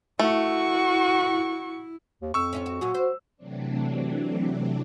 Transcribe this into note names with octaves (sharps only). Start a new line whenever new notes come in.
A3 E4 F#4 C#6
D#2
F2 C#6 E6
C#4 E4 F4
F#4
A#2 F#3 F#4 G#4
C5
C3 E3 F#3 A3 C4 D4